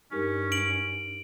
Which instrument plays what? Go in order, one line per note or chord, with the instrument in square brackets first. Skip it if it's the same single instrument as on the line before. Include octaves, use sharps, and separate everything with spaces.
[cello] G2 [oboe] C#4 [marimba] D#4 G4 A#4
[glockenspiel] D7 F#7